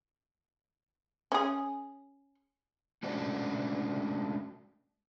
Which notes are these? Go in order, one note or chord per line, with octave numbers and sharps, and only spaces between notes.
C#4 G#4
G#3 A3 C#4 D4 F#4 C5